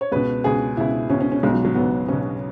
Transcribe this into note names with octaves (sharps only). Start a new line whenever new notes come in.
C#5
C#2 B2 B4
C#2 B2 G#4
C#2 B2 E4
C#2 B2 C#4
C#4
C#4
B1 B2 G#3
F#3
F#3
B1 B2 B3
B1 B2 C#4